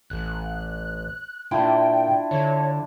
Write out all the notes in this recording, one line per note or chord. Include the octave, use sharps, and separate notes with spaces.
A1 F#6
A#2 D4 E4 F4 G5
D3 C#5